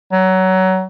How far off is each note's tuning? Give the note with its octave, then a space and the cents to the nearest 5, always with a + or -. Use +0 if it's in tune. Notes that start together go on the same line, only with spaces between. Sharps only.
F#3 +20